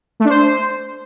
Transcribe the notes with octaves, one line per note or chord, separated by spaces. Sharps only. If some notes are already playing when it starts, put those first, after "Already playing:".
A3
D4
C5